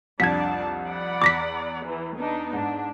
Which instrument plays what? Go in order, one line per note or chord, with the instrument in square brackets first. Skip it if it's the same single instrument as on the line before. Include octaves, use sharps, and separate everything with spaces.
[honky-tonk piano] C2 F2 [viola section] D4 A5 [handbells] G#6 B6
[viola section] D5 F#5 B5
[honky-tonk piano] E2 [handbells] D6 A#6 B6
[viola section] E3
B3 D4 D#4
[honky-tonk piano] G#2 [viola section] D4